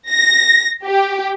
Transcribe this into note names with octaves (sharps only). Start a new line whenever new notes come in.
A#6
G4